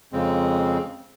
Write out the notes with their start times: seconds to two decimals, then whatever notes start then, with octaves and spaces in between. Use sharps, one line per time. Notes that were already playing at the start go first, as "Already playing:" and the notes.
0.12 F2 C#3 G#3 C4